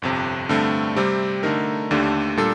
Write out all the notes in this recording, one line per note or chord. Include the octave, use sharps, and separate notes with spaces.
G1 F2 C3
G2 D3 A3 C4
C3 G3 C4 G4
D3 A3 D#4 A#4
D#2 D3 A3 D4 G4
A#2 G3 D4 A4